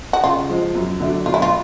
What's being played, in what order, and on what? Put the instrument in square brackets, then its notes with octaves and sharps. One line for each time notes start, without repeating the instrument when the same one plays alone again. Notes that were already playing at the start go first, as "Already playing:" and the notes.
[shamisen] F#4
[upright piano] C#3 [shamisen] F4
[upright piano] F3 G#3
F#2
D3 F#3 A3 D4
[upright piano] B1 [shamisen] F4
[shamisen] E4
F4